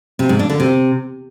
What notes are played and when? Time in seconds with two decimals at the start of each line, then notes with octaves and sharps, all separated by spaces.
0.19 C3
0.29 G#2
0.39 D4
0.50 D3
0.60 C3